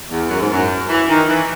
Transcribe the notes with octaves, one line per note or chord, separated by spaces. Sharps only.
E2
F#2
G#2
F#2
E3
D#3
E3